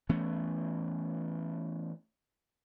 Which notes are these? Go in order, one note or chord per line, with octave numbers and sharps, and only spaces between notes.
E3 A3 B3 C#4